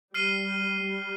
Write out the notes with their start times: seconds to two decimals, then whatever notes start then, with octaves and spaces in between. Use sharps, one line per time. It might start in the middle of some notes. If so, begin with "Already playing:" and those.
0.14 G3 F6 C7 D#7 G7
0.82 G3